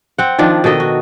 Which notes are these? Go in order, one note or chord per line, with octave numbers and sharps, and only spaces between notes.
C4 F#5
D#3 F3 D4
B2 D#3 A4 D#5
F#4